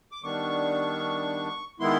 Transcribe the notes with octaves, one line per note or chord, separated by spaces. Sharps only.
D6
D#3 G3 B3 D4 C#6
D#3 G#3 B3 E4 C6